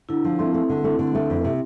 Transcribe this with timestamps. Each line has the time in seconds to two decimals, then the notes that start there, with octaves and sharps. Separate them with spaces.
0.09 D3 E4
0.25 F3
0.39 A3 C4
0.54 A3
0.70 D3
0.84 A3
0.99 D3
1.15 A3
1.30 F2
1.44 C3